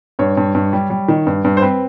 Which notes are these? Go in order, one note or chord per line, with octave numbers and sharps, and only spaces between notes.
G2 C#5
G2
G2
G3
G3
D#3
G2
G2
C5
C4 B4